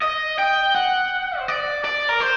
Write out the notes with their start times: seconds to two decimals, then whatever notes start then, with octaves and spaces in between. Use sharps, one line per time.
0.03 D#5
0.39 G5
0.75 F#5
1.38 C5
1.48 D5
1.85 D5
2.09 A#4
2.21 C5